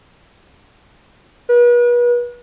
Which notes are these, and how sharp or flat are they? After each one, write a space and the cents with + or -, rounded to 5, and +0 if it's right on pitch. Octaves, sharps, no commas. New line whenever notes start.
B4 -40